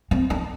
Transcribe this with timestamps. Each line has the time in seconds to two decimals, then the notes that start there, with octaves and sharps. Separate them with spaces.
0.11 C4
0.30 D4